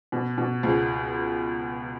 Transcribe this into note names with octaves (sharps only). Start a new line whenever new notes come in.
B2
B2
C#2